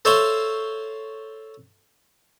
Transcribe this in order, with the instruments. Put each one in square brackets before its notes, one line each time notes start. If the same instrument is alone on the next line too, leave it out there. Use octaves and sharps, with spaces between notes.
[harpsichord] A4 C5 C#5 E5 F5 C6